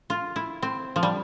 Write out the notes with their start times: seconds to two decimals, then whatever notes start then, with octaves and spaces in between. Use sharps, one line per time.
0.10 F4
0.36 E4
0.62 C4
0.96 F3
1.03 G3